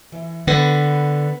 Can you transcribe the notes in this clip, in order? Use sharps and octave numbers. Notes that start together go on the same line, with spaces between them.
E3
D3 B3 B4 F#5